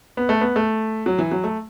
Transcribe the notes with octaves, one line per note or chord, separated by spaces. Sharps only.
B3
A3
B3
A3
F#3
E3
F#3
A3